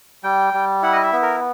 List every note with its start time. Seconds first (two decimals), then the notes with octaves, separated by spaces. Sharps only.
0.24 G3 G5
0.54 G3
0.83 E4 F#5
0.93 D#5
1.03 E5
1.13 B3
1.23 A#4